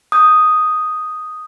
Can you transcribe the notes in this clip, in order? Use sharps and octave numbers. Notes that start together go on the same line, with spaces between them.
D#6 G6